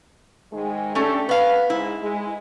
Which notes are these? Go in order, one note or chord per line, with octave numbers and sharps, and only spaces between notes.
G#2 D#3 G#3
A3 C#4 D4 G4 A4
B3 B4 F5
G#2 E4
G#3